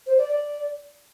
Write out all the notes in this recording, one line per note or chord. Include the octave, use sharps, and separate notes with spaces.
C5
D5
D5